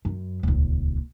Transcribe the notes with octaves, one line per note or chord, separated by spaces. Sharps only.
F#2
D#1 C#2